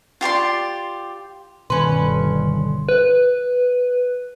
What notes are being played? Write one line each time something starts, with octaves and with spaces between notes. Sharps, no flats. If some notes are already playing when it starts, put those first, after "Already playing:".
F4 G4 D5 C6
G1 B2 D3 D#3 G3 C#4 B4 C6
B4